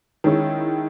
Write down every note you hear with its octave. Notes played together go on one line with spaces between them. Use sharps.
D#3 G#3 C#4 E4